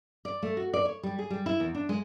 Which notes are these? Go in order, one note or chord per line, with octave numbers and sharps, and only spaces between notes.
D5
A3
F#4
D5
C#5
G3
G#4
G3
E4
E2
D4
G#3